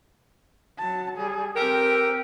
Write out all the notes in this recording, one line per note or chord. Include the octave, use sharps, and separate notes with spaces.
F#3 A5
G3 G#4
C4 G4 A4 A#4 G5